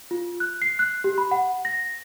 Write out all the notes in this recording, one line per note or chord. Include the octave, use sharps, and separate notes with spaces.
F4
F#6
C7
F#6
G4
B5
F#5
A#6